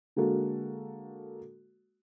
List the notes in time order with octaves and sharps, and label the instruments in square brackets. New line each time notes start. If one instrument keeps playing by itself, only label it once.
[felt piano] D3 G#3 A#3 F#4 A4